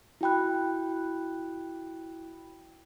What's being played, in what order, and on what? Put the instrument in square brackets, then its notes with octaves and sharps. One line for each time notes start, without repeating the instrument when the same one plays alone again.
[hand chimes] E4 F#4 G5 B5 F#6